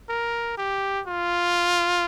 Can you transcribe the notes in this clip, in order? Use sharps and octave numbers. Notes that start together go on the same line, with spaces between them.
A#4
G4
F4